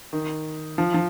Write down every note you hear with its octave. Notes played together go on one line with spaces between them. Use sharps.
D#3
F3
F3